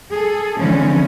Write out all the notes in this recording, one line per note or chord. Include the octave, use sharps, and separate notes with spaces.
G#4 A4
D3 E3 F3 G#3 C4 C#4